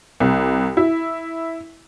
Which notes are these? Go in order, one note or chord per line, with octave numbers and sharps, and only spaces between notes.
C2
E4